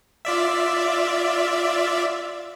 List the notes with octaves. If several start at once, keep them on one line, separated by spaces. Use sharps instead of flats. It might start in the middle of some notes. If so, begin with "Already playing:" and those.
F4 D5 E5